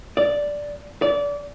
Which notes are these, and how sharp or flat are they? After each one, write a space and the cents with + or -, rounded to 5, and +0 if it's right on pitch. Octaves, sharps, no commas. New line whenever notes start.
D5 -5
D5 -25